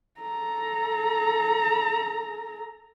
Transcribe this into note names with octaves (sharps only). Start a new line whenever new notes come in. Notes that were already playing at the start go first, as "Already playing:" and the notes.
A4 A#5